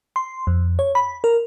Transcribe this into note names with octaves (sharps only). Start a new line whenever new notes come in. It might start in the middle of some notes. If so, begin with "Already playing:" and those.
C6
F2
C#5
B5
A#4